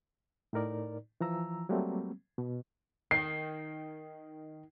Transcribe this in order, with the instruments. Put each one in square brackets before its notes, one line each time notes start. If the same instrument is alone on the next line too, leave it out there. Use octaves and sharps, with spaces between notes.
[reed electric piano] A2 D#4 A#4 D5
E3 F3 A#5 E6
F#3 G3 A3 A#3 C4
B2
[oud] D#3 [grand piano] C7